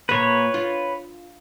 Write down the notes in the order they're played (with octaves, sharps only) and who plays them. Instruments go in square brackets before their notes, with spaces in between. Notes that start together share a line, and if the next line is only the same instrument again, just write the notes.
[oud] A#2 A#3 [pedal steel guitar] B4 C#5
[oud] F4